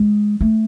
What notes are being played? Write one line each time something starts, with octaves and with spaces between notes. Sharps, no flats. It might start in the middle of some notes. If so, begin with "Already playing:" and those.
Already playing: G#3
A3